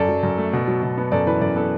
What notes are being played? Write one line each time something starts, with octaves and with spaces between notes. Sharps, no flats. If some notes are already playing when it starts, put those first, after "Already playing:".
Already playing: F#2 A4 D5
F#3
F#2
A3
B2
F#3
B2
B3
F#2 A4 D5
E3 B4
F#2 A4 D5
B3 A4